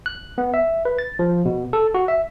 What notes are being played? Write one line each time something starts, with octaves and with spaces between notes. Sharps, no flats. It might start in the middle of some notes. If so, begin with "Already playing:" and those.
F#6
B3
E5
B4
A6
F3
B2
A4
F#4
E5